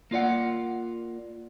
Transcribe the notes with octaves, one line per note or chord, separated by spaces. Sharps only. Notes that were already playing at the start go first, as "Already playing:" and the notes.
A#3 F4 D5 F#5